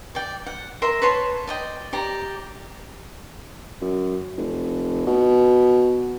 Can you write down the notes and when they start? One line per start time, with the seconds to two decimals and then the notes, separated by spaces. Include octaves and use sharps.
0.15 D5 G5
0.46 F#5
0.82 A#4 E5 C6
1.02 B4 C#5 A5 C6
1.47 D5 D#5 G5
1.93 G4 D5 A#5
3.82 F#2
4.37 F1
5.07 B2